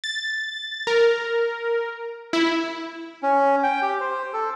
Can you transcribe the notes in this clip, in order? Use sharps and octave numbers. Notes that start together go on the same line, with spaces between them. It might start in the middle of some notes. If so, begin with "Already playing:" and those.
A6
A#4
E4
C#4
G5
G4
C5
A4